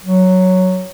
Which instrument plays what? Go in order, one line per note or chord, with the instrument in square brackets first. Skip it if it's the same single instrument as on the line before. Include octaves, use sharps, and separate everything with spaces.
[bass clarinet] F#3